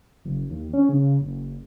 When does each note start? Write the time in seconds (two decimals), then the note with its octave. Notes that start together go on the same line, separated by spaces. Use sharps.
0.25 F#1
0.50 D#2
0.73 C#4
0.89 C#3
1.20 F#1